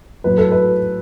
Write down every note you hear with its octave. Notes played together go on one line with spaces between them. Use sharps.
A2 F#3 B4
A4
B4